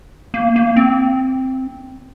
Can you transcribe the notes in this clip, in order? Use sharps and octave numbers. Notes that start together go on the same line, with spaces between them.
A#3
A#3
C4